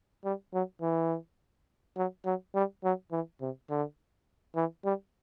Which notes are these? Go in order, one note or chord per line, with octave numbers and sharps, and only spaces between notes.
G3
F#3
E3
F#3
F#3
G3
F#3
E3
C3
D3
E3
G3